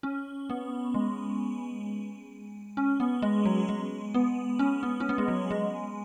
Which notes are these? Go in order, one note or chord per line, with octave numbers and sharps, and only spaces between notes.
C#4
B3
G#3
C#4
B3
G#3
F#3
G#3
B3
C#4
B3
C#4
B3
G#3
F#3
G#3